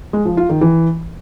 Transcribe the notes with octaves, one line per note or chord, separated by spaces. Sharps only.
G#3
F3
F4
D#3
E3